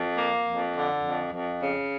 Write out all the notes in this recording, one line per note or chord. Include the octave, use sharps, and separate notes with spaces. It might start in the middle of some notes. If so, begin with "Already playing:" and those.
Already playing: F2
A#3
F2
D3
F2
F2
C#3